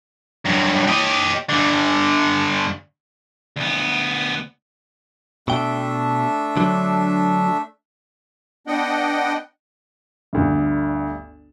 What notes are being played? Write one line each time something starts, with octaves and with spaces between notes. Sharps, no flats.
G2 F#3
G4 D#5
G2 D3
D2 B3
B2 A3 D4 E5 G5
D3 F#3
B3 D4 D#5 F#5 G5
G1 D2 G2